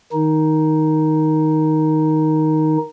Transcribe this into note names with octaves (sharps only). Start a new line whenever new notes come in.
D#3 D#4